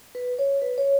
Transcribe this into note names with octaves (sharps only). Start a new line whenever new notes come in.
B4
C#5
B4
C#5